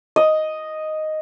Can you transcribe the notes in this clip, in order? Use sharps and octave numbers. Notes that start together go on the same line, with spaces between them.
D#5